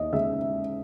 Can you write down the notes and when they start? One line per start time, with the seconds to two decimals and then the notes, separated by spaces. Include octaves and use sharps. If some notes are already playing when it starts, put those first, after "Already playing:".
Already playing: D#2 D#5 E5
0.12 C#3 G#3 E5